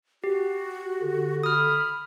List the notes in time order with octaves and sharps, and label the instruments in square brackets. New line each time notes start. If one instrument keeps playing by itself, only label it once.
[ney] F#4 [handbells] G4
[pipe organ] D3
[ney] B5 [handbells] D#6 F6